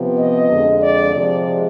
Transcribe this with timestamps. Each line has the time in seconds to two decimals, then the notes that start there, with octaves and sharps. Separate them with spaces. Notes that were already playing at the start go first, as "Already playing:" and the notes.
Already playing: C3 F3 B3
0.17 D#5
0.49 F2 D3 G#3
0.81 D5
1.14 C3 F3 G#3 D5